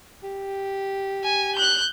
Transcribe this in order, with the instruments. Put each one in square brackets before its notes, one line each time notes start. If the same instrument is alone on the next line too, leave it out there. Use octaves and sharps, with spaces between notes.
[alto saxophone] G4
[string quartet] G#5
F#6 G6